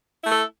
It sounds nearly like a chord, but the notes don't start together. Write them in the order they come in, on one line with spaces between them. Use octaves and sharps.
E4 A3 A4